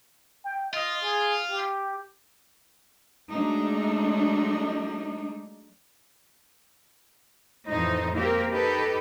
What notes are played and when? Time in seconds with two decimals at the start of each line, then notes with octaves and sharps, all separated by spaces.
0.45 G5
0.74 F4 D#5
1.03 G#4
1.50 G4
3.30 F#3 G#3 A3 D4 D#4
7.67 F2 A2 E3 D#4 C5
8.14 A#3 C4 G4 A#4
8.52 D#4 G4 A4 B4